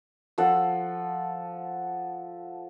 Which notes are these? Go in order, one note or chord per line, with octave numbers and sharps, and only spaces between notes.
F3 A4 F#5